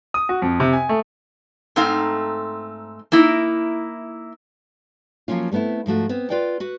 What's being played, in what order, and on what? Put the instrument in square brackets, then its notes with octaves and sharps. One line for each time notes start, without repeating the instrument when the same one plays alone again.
[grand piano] D#6
F#4
F2
C3
G#5
A3
[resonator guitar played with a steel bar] G#2 A3 C4 D#4 F5
A#3 D#4 E4
[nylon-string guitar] F3 F#3 A#3 C#4 F4
G3 A3 B3 C4 E4
G#2 F3 A3 F#4
B3 C4
F4 B4 D5 G5
F#4 B4